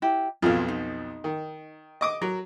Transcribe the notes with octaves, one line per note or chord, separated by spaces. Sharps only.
E4 G4
B1 F2 F4 G#4 F5
D#4
D#3
D#5 D6 D#6
F#3 A#4